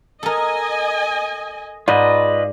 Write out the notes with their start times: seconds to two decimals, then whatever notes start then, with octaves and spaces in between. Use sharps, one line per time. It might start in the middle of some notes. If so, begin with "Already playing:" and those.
0.23 A4 A#4 D#5 G#5
1.88 G#2 F4 B4 D5 D#5